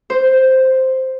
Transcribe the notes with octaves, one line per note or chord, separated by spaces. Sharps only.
C5